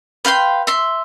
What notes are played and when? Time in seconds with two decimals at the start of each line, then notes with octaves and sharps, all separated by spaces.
0.25 B4 F5 G5 C6
0.67 E5 C6